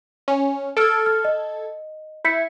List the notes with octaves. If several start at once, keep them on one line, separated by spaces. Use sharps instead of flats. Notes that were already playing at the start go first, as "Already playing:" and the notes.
C#4
A4 E6 F6 G#6 D7
F6
D#5
E4 G6 B6 C#7